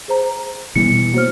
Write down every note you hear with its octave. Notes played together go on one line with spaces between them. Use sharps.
G#4 C5 A#5
E2 B2 G3 B3 C#7
F#3 A#3 C5 F6